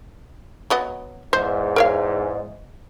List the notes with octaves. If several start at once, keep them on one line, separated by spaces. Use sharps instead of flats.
F#3 B3 D#5
E2 G#2 C5
A#4 C#5 F5